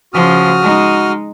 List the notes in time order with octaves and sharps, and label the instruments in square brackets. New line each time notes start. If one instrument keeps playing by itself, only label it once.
[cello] C#3 F3 [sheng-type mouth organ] F#4 D#6 F6
[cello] G#3 D#4